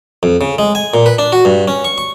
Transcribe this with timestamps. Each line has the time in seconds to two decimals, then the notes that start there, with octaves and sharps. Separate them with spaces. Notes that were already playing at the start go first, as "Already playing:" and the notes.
0.23 F2
0.41 C#3
0.58 G#3
0.75 G#5
0.94 A#2
1.06 B4
1.19 D4
1.32 F#4
1.45 G2
1.68 C#4
1.85 C#6
1.98 C#6